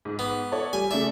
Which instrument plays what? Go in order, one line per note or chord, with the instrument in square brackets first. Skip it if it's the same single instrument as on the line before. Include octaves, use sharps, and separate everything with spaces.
[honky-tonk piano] G#2
[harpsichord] B3
[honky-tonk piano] A4 C#5 D5
[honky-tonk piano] G3 [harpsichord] G#5
[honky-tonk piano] C#3 A3 D5 [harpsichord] E5